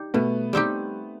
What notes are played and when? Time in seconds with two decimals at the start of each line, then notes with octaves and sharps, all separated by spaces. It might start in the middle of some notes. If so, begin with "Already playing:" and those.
Already playing: G3 D#4 G4
0.14 B2 A3 B3
0.53 G3 C4 D#4 G4